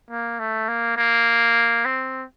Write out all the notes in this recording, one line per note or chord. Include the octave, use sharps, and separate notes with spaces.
A#3
A3
A#3
A#3
C4